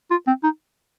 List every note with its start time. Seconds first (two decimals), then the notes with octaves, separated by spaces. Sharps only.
0.11 F4
0.27 C4
0.44 D#4